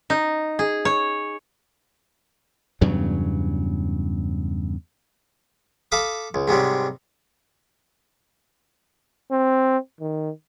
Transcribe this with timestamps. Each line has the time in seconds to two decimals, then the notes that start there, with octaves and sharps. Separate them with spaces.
0.10 D#4
0.59 G#4
0.85 C#5
2.81 E2 G2 C#3 F#3
5.92 A4 F5 B5 D6 D#6
6.34 C#2
6.48 G#2 C3 F#3 G3
9.32 C4
10.00 D#3